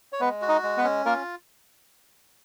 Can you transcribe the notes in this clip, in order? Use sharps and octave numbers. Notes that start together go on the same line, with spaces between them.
C#5
G#3 B3 B4
F#4
D#4 D#5
G#3
B3 B4
C#4
A#3 F4 A#4